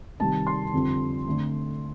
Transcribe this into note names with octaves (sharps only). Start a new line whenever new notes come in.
C3 D#3 G3 C4 A5
C6
F2 D3 G3 C4
D3 A3 C4